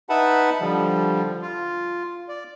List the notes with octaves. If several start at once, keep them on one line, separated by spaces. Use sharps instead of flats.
D#4 B4 E5 F#5 A5 B5
D3 F3 G3
F4
D5